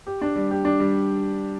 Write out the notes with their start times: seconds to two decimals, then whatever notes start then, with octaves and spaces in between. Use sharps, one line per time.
0.07 G4
0.22 D4
0.36 G3
0.51 G4
0.65 D4
0.80 G3